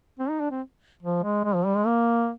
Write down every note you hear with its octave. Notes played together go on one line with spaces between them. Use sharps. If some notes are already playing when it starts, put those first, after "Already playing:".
C4
D#4
D4
C4
F3
G#3
G#3
F3
G3
G#3
A#3